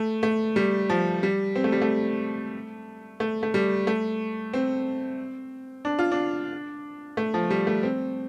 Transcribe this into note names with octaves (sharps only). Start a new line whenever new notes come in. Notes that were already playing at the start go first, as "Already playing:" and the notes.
Already playing: A3
A3
G3
F3
G3
C4
A3
G3
A3
A3
A3
G3
A3
C4
D4
F4
D4
A3
F3
G3
A3
C4